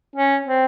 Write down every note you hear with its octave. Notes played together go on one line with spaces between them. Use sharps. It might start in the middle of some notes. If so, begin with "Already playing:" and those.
C#4
C4